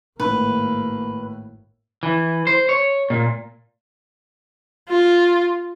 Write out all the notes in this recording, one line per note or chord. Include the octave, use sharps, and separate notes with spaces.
G#1 A2 A#3 B4
E3
C5
C#5
A#2
F4